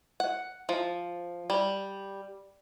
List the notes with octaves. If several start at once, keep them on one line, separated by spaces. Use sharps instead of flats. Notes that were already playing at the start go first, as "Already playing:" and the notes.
F#5
F3
G3